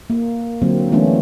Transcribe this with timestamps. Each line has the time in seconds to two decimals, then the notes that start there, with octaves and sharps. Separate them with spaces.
0.10 A#3
0.62 D3 F#3 A#3 C4
0.92 E3 A3 B3 C#4 D4 E4